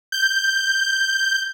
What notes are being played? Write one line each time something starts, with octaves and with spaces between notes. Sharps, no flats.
G6